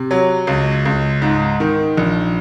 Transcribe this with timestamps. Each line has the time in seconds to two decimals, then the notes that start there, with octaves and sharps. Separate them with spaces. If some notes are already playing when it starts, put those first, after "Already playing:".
Already playing: C3
0.11 F#3
0.47 C#2
0.85 C#2
1.22 G#2
1.60 D#3
1.97 A#1